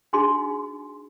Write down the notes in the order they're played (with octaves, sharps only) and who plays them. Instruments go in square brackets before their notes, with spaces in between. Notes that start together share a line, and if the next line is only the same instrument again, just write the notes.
[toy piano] D4 D#4 F#4 G#4 C6